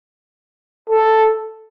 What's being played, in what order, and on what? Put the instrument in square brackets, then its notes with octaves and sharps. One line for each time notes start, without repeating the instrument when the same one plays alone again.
[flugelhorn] A4